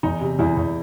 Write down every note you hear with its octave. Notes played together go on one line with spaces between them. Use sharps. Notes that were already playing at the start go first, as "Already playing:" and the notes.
E2 D#4
C3
E2 E4
E2